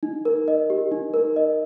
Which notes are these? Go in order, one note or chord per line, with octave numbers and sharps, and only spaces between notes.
D#4
A#4
D#5
G4
D#4
A#4
D#5